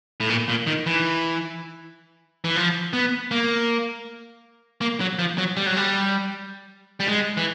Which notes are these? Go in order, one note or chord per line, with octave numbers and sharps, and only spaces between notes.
A2
A#2
A#2
D#3
E3
E3
F3
B3
A#3
A#3
F#3
F3
F#3
G3
F#3
G3
G3
G#3
E3